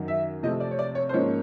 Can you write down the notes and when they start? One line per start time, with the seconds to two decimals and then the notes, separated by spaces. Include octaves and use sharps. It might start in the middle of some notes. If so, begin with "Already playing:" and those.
Already playing: F#2 D#3 F#3
0.08 E5
0.43 C3 F3 A3 C4 D#5
0.60 D5
0.71 C#5
0.79 D5
0.95 C#5
1.09 C5
1.13 G#2 F3 A#3 C#4 C#5